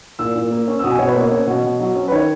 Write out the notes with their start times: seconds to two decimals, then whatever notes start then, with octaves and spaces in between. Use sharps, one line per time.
0.19 A#2 E6
0.35 A#2
0.51 A#3
0.68 C#4
0.79 E6
0.84 B2 D#6
0.91 G#5
0.99 B2 C#5
1.08 B4
1.15 A#3 C#5
1.31 C#4 C#5
1.47 B2
1.64 B2
1.80 F#3
1.95 C#4
2.08 B4
2.12 D#3 C#5